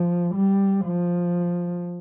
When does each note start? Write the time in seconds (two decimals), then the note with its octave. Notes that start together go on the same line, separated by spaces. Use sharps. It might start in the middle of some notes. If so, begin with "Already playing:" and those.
Already playing: F3
0.35 G3
0.85 F3